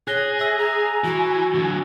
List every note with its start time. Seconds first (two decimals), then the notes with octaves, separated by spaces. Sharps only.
0.08 G#4 C#5 F#6 A#6 G7
0.39 E5 E6 A#6
0.58 G#5 A#5
1.04 E3 F#4
1.55 D3 F#3